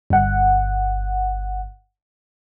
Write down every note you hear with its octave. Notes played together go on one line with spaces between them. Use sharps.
G1 F#5